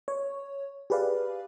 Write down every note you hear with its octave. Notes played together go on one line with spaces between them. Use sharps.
C#5
G4 G#4 B4 D5 F5